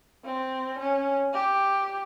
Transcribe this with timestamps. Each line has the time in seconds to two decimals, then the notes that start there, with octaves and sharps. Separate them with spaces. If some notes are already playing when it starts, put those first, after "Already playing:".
0.25 C4
0.79 C#4
1.34 G4